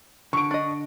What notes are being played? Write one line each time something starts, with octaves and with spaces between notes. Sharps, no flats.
D3 C#6 D7
D4 D#5